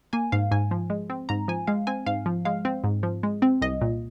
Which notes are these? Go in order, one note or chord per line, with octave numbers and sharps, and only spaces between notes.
A#3 G#5
G#2 F5
G#2 G#5
F3
G#3
C4
G#2 A#5
F3 G#5
G#3 F5
C4 G#5
G#2 F5
F3
G#3 F5
C4
G#2
F3
G#3
C4
C2 D#5
A#2